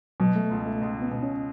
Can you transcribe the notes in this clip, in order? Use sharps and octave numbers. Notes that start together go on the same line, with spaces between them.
B2 F#3
A3
C#2
A3
C#2
B3
B2
C#4